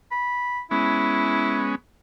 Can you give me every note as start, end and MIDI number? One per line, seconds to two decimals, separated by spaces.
0.11 0.61 83
0.71 1.75 56
0.71 1.75 59
0.71 1.75 61
0.71 1.69 64